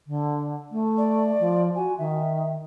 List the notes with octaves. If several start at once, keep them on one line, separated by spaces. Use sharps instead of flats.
D3
A3
D5
F3
F#4 G#5
D#3 E5